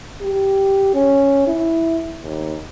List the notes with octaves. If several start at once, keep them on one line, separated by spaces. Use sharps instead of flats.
G4
C#4
E4
D#2